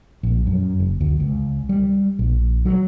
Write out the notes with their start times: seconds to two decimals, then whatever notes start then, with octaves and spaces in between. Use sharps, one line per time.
0.23 A#1
0.47 F#2
0.80 F#1
1.01 D2
1.20 C#2
1.69 G3
2.19 A#1
2.65 F#3